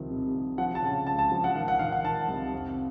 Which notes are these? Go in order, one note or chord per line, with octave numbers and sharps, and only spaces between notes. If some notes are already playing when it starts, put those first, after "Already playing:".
Already playing: C2 D#3 F3
C3
C2
F3 F#5
A5
C#3
C#2 A5
A5
F3
F#5
D#3 F5
F#5
D#3 F5
F#5
D#3 A5
C2
F2